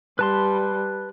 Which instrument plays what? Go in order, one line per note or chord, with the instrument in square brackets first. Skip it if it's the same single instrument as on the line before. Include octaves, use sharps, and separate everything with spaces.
[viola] G3 [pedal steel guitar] B4 A5 C6